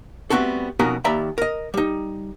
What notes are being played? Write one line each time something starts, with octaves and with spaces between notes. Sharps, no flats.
G3 A3 B3 C4 F#4 A4
F2 B2 C#4 D#4 F#4 A#4
D#2 D5 E5 G5 A#5 B5
A#4 D#5
G3 D#4